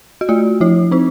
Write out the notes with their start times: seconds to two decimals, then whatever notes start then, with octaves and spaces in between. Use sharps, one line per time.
0.21 F#4
0.29 A3 F4
0.61 F3 E4
0.91 C4 D#4